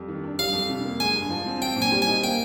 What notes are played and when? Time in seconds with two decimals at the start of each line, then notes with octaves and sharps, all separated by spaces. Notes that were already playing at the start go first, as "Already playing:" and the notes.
Already playing: F2 G3
0.08 D#3
0.24 D4
0.39 G3 F5
0.53 F2
0.69 C3
0.85 A#3
1.00 G#3 G#5
1.16 G2
1.30 F3
1.46 C4
1.61 C4 G5
1.76 A#2
1.82 G#5
1.92 G3
2.02 G#5
2.08 D#4
2.23 A#3 G5